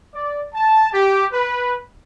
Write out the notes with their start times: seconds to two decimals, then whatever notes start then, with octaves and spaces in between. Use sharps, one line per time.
0.15 D5
0.55 A5
0.93 G4
1.33 B4